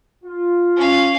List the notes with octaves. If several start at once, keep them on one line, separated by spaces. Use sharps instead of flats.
F4
C#4 F5